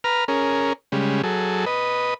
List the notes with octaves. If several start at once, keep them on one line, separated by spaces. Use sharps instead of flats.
B4 A#5 F6
C#4 G#4 A#4
C#3 G3 G#3
F#3 G#4 A4
B4 D#5